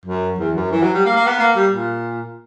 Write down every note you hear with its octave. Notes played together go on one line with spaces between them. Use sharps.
F#2
E2
F#2
E3
F#3
G3
A#3
A#3
B3
A#3
G3
A#2